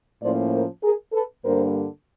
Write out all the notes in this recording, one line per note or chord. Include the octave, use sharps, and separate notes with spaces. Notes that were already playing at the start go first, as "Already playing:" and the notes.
A2 F3 A#3 C#4 C5 D5
A#4 C5
G#4 A#4
A4 B4
G2 D3 G3 A#3 A#4 C5